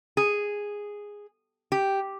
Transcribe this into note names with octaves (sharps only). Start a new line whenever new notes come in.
G#4
G4